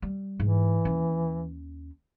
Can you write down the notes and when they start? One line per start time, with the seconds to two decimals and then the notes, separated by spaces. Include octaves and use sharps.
0.02 G3
0.40 G#2 E3
0.85 D#2 C#4